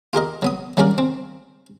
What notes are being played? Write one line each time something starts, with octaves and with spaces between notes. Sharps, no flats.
F4 G4 A#4 D#5
F#3 B3 D#6
F#3 G3 A#3 C#4 A#4 D5
C4